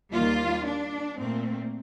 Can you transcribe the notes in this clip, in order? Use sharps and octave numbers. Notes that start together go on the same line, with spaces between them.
D#2 D#3 G3 A#3 F4
D4
A#2 A3 C4